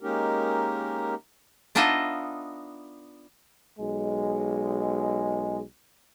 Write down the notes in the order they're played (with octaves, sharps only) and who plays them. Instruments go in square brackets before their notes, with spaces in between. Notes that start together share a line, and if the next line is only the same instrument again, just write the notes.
[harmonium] G#3 A#3 C#4 D#4 G4 A#4
[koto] B3 D4 D#4 F4 D#5 E5
[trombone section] B1 G#3